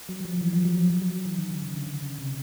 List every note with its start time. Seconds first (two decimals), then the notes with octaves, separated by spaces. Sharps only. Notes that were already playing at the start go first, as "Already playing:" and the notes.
0.09 F#3
0.20 F#3
0.25 F3
0.41 E3
0.53 F3
0.65 F#3
0.77 F3
0.90 F#3
1.02 F#3
1.26 E3
1.38 D#3
1.50 D3
1.62 C#3
1.75 D3
1.86 D3
2.02 C#3
2.19 C3